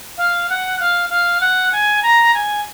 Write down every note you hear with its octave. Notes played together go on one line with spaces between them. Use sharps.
F5
F#5
F5
F5
F#5
G#5
A#5
G#5